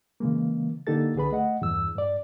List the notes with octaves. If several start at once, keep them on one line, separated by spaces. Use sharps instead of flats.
C#3 E3 G#3 A#3
D3 A#3 D#4 G4 A4 A6
C2 D3 G#4 B4 B5
A3 D#5 F#5
E2 G2 E6
G2 D5